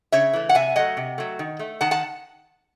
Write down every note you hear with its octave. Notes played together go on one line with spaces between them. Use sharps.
C#3 C#5 E5
E3 A3
F#5
C3 E5 G#5
F#3 A3 D#5 F#5
C3
F#3 A3
D#3
A3
D#3 F#5 A5
F#5 A5